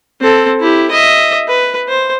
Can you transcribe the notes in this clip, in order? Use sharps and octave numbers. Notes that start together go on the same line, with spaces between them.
C4 A4
E4 G4
D#5 E5
B4
C5